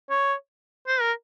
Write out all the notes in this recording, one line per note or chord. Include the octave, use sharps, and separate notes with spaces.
C#5
C5
A#4